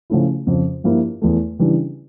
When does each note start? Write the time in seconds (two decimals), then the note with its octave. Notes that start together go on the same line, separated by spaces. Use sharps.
0.10 C#3 F3 A3 C#4 E4
0.47 F2 C#3 F3
0.84 G2 F3 A#3 E4
1.22 E2 E3 A3
1.59 C#3 E3 G3 D4